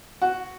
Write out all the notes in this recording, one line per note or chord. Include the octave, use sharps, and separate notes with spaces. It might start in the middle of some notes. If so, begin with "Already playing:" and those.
F#4